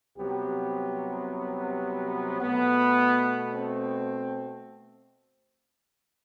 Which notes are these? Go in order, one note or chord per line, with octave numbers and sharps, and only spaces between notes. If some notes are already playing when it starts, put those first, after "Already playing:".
C2 C3 F#3 B3 G4
B2 A3 B3
C4